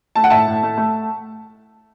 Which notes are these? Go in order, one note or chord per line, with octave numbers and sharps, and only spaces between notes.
A3 A5
F#5
A2 E5 A5
A2
A3
A3